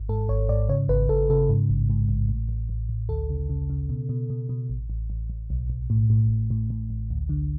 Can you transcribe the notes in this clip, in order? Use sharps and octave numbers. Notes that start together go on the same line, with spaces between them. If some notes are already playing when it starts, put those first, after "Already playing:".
Already playing: G#1
G#2 A4
G#1 C#5
G#2 D5
C#3 C#5
G#1 B4
G#1 A4
C#3 A4
G#2
A1
G#2
A1
A2
A1
A1
A1
D2 A4
C#3
C#3
C#3
B2
B2
B2
B2
A1
A1
A1
A1
B1
B1
A2
A2
A1
A2
A2
A1
D2
D3